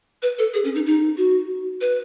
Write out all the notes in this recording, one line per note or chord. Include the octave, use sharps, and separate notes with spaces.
B4
A4
G#4
C#4
D#4
D#4
F#4
B4